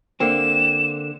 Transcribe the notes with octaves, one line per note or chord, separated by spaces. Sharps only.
D3 A#3 C4 E7